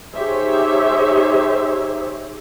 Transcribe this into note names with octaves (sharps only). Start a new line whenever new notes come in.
D#4 G4 G#4 C5 C#5 E5